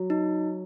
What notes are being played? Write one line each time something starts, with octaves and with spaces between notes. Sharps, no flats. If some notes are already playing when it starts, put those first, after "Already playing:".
Already playing: F#3
D#4